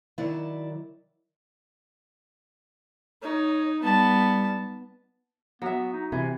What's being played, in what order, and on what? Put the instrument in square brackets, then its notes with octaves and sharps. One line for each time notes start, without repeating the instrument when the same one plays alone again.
[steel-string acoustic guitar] D#3 F#3 E4 D5
[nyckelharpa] D#4 [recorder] C#5
[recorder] G3 [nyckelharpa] B3 A5
[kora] F#3 E5 [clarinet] B3
[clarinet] D#4
[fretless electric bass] C3 [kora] E3 [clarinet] G#5